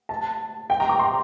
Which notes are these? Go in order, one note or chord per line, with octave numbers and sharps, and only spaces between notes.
A5
G5
A#5
D6
C6